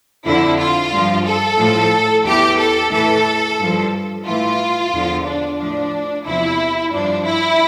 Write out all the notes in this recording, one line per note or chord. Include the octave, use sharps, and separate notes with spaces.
F2 D3 F3 E4
F4
G2 F3
A4
A2 F3
E2 E3 G4
A4
A2 E3 A4
G2 F3
A2 E3 F4
E2 D3 F3
D4
A2 F3 D4
E2 C3 F3 E4
G2 F3 D4
E4